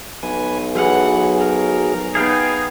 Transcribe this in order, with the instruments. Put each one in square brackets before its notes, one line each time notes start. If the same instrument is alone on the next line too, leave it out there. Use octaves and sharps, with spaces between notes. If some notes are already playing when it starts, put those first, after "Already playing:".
[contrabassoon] B1 [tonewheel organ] B4 G#5
[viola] E3 F#5 [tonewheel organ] F#3 G#4
[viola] A#4
[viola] B3 D#4 [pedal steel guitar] G#4 F5 G5